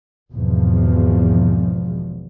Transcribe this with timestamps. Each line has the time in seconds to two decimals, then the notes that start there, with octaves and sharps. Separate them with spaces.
0.33 G#1 E2 B2 F3